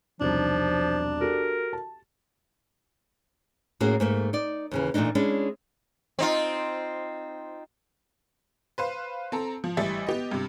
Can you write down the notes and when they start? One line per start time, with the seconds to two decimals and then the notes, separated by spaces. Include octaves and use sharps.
0.21 E1 C2 F3 D4 D#4
1.21 F#4 G4 A4 A#4
1.73 A5
3.80 A2 A#3 C#4 F#4 G#4
4.00 G#2 A3 A#3
4.33 D#4 D5
4.71 D#2 C#3 E3
4.94 A#2 E3 A3 D4 D#4
5.15 G#3 C#4 D4 E4
6.19 C4 D#4 F4
8.78 B4 C5 F5
9.32 C4 A4 A#5
9.64 F3
9.77 A1 E3 G3 E5 A6
10.07 B3 G4 D#5
10.31 G2 C3